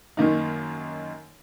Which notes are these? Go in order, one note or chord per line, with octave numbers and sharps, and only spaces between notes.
F#2 D#3 A#3 D#4